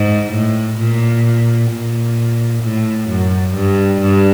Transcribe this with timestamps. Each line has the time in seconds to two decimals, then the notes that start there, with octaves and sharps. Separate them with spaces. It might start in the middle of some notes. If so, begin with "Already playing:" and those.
Already playing: G#2
0.34 A2
0.79 A#2
1.71 A#2
2.64 A2
3.09 F#2
3.55 G2
4.01 G2